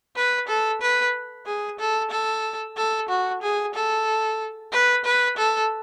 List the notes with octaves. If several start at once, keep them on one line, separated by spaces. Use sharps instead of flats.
B4
A4
B4
G#4
A4
A4
A4
F#4
G#4
A4
B4
B4
A4